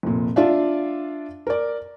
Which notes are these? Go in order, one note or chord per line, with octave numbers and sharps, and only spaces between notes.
F1 A#2
D4 F4 D5 E5 F5
A#4 D5